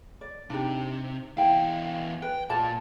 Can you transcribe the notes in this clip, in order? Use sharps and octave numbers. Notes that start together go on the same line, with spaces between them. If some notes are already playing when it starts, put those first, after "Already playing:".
D5
C3 D4 D#4 G4
E2 E4 F5 G5
B4 G5
A#2 F4 D5 A5